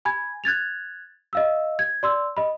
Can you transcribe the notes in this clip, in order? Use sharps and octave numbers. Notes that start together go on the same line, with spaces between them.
G#5 B5 G#6
F#6 G#6 A6 F7
D#5 F5 E6
G#6
D5 C6 E6
D#5 B5